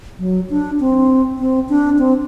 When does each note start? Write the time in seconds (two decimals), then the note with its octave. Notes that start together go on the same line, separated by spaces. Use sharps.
0.19 F#3
0.50 D4
0.80 C4
1.39 C4
1.69 D4
1.99 C4